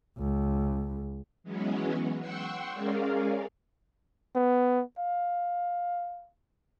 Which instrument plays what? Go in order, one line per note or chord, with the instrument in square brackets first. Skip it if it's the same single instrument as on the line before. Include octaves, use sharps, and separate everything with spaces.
[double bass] C#2
[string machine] E3 F#3 G#3 B3 C#4
F#5 G5 C6 C#6 E6
G#3 C#4 G#4 A#4 D5 F5
[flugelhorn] B3
F5